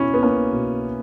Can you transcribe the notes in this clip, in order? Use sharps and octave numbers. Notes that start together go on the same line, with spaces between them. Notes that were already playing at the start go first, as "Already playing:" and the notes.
Already playing: B2 C#4 E4
B3
A#3 C#4
B2